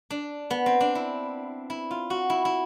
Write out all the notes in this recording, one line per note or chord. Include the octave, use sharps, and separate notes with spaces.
D4
B3
C4
D4
E4
E4
F4
F#4
E4
E4